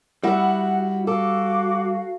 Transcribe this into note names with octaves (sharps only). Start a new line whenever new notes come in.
G3 E4 F#4 F#5
F#4 A4 F5 D6